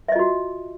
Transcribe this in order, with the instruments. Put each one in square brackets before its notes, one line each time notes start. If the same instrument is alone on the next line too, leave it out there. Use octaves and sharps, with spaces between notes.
[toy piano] E5
D#5
F4
F#4